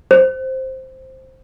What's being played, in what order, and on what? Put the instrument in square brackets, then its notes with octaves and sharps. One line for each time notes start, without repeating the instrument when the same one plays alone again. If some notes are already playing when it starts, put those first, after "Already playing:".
[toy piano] C5